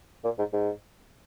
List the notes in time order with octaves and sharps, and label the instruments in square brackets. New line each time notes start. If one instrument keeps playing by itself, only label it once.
[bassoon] A#2
G#2
G#2